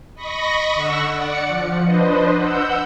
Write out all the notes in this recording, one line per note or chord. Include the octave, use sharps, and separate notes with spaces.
D#5 B5 C#6 A#6
D3 F#5 C#6 E6
D5 F#5 C#7
F3
D4 B4 C5 D#5
F#5 E6 G6